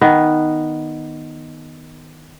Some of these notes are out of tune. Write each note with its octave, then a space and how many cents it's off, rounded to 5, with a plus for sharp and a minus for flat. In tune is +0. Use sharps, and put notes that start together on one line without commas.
D#3 +0 B3 +0